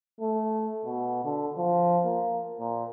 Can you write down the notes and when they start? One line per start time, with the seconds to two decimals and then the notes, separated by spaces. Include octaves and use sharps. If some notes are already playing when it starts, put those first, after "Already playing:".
0.21 A3
0.85 B2
1.25 D3
1.58 F3
2.05 A#3
2.59 A#2